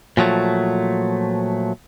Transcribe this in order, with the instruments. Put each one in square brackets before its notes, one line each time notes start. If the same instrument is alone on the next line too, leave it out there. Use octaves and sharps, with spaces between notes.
[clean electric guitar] A#2 F3 F#3 A3